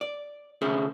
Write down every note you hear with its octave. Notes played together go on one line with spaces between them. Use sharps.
D5
D2 C3 C#4 G#4 A4 E5